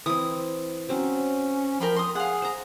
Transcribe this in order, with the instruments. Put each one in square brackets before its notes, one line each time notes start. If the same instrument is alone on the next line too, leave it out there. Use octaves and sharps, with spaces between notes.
[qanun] E3 C4 [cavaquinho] D#6
[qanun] F#3 C4 [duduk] C#4
[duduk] F3 [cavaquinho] A#4 G5 B5
[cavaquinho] C6 D#6
[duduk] G#4 [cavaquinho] F5 F#5
[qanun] C5 A#5